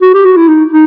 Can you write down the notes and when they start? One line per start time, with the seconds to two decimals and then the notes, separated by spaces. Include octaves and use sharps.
0.02 F#4
0.14 G4
0.25 F#4
0.37 E4
0.48 D#4
0.71 D#4